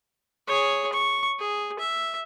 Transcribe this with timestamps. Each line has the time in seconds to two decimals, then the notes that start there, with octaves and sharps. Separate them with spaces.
0.47 G#4 C#5
0.93 C#6
1.39 G#4
1.79 E5